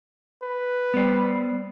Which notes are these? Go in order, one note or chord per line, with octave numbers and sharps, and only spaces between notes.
B4
G3 B3 C5